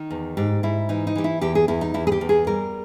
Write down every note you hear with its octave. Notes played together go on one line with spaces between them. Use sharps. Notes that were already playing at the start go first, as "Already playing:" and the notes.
Already playing: D#3 D#4
E2
G#2 G4
G#2 E4
E3 D#4
D#4
E3 G4
E4
E2 G4
G#4
E2 E4
D#4
E2 E4
G#4
G4
E2
G#4
G3 A#4